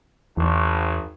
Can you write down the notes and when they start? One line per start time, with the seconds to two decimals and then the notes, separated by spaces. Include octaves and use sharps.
0.37 G#1 E2